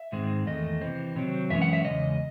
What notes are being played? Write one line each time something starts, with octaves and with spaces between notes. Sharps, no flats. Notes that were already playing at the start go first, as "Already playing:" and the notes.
Already playing: E5
G#2 D#3 G#3 C4
E2 D#3 A3 D#5
C3 E3 C4
C3 D#3 F#3 C4
F#2 E3 G#3 C#4 E5
F#5
E5
E2 C#3 G#3 D#5